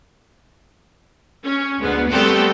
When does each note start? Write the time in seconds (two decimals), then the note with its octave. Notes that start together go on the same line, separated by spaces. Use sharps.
1.45 C#4
1.79 D2 G#3 B3
2.11 G3 A3 B3 C4 G4 A4